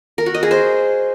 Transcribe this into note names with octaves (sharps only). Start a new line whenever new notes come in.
A#4
F#4
D#5
G#4
C5